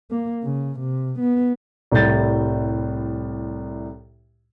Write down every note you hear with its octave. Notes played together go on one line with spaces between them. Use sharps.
A#3
C#3
C3
B3
C2 A2 G3 G6 A6